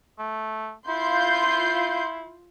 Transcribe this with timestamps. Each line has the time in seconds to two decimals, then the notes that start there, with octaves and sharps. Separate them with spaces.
0.19 A3
0.88 E4 F4 C6 G6